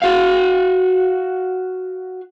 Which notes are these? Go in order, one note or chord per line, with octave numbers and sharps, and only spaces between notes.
F#4 F5